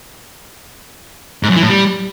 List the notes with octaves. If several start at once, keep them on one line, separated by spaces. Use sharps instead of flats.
G#2
F#2
E3
A2
G3